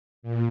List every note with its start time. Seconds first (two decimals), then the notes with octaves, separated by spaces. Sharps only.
0.23 A#2